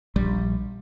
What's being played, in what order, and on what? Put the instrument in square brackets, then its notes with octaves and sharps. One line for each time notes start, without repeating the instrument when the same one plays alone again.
[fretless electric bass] A#1 G3